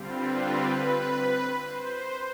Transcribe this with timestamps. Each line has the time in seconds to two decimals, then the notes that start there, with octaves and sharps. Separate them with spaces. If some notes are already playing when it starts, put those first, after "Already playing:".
Already playing: D3 G3 C4 F4
0.13 B4
0.42 B4
1.60 C5